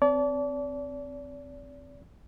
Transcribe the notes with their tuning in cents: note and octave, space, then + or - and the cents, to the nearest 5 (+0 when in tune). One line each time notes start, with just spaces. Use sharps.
C4 -10 D5 -35 A5 -20